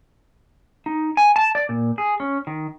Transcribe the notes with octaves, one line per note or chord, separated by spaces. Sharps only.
D#4
G#5
A5
D5
A#2
G#4
C#4
D#3